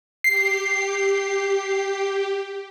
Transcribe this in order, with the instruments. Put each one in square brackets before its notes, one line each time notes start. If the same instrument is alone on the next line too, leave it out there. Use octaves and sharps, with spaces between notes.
[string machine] G4 [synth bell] C7